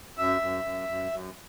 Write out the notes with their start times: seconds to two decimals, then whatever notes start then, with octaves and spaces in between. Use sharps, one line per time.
0.18 F#2 E5
0.41 F#2
0.64 F#2
0.89 F#2
1.12 F#2